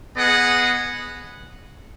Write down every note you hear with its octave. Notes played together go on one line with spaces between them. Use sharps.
B3 G#4 D#5 F#5